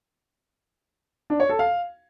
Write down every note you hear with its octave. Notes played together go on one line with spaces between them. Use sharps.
D4
C#5
A4
F5